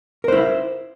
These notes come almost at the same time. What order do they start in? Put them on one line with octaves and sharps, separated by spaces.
A#4 C5 E4